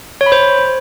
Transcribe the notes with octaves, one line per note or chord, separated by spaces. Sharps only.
C#5
B5
C5